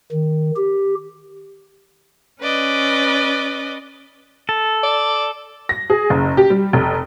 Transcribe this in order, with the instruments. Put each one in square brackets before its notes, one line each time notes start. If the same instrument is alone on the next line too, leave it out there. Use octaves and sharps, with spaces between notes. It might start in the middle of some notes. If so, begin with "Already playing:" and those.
[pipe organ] D#3
G4
[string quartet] C#4 B4 D5 D#5
[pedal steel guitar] A4
[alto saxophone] D5
[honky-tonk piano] A#6
G#4
F#1
G4
G3
F1